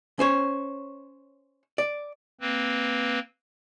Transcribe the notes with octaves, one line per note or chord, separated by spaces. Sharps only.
C#4 C5 C#5
D5
A#3 C4 B4